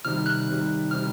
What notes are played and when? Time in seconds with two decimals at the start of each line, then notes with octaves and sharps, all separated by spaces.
0.04 C3 D#3 G3 F6
0.26 F#6
0.48 C3 D#3 G3
0.91 C3 D#3 G3 F6